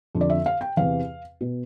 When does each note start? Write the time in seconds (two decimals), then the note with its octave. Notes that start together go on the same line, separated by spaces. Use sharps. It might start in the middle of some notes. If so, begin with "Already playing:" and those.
0.15 F2 D3
0.21 D5
0.30 E5
0.46 F5
0.61 G5
0.77 E2 C3 E3 F5
1.41 B2